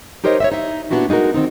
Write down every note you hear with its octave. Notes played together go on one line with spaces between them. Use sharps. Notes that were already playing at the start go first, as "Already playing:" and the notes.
D#4 G4 A#4 C5 C#5 D#5
C#5 D#5 E5
D#4 E5
A#2 B3 D4 E4 F#4 G4
G#3 D#4 F4 F#4 A#4
D#3 C4 D#4